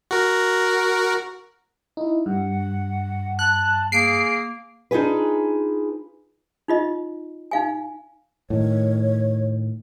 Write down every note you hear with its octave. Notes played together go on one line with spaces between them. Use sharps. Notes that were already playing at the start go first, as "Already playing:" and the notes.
F#4 A#4
D#4 E4
G2 F#5
A5 F#6
A#3 G#4 C7 D7
D4 D#4 F4 G#4 B4
D#4 F4 D#5
D#4 F5 G#5
A2 D#3 C#5